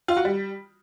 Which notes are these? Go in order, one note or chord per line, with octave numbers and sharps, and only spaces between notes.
F4
F#4
G3